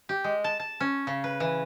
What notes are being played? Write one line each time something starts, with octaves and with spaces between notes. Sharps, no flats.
G4
G#3
A5
A5
C#4
C#3
B4
E3